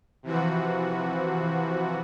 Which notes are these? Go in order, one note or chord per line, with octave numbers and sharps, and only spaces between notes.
C3 E3 F3 F#4